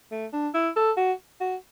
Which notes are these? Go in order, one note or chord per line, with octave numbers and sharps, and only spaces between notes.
A3
D4
E4
A4
F#4
F#4